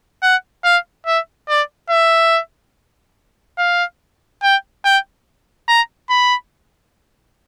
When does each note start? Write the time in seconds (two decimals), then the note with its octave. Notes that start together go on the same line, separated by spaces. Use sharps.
0.23 F#5
0.64 F5
1.06 E5
1.49 D5
1.90 E5
3.58 F5
4.43 G5
4.85 G5
5.68 A#5
6.10 B5